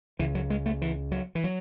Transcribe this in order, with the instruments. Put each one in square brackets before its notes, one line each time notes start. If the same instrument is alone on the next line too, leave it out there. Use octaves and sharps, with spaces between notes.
[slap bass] C#2 C#3 E3
F#3
G#3
A3
E3
F#3
E3
F#3